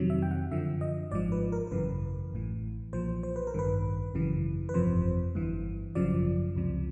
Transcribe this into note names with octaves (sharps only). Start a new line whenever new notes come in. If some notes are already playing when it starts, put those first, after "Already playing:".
Already playing: F2 C3 D#3 F#3
E5
G5
F#5
F#2 D3 F3 E5
D#5
G#1 G#2 F3 D5
B4
A#4
A#4
G#1 F#2 C#3 E3 B4
A1 A2 E3
B1 A#2 F3 C5
C5
B4
A#4
A1 G2 D#3 B4
G#1 F#2 C#3 E3
B4
G1 F2 C3 F3 C5
G1 G2 E3
G#1 F#2 C#3 F3 D5
C#2 C3 F3